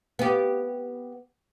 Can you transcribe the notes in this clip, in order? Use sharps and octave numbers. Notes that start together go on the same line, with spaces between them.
B3 G4